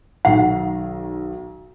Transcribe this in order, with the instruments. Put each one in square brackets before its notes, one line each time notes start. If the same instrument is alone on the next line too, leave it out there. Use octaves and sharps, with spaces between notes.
[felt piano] B1 D#3 [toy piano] F#5